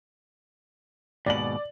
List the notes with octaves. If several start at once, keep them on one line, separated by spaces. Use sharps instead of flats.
D#2 G#2 B2 D5 F#7